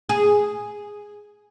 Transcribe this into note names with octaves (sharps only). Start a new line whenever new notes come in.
G#4